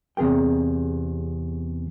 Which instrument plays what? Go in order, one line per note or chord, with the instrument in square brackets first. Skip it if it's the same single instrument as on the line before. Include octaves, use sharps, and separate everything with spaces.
[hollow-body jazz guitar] E2 C3 G#4 A#4 G5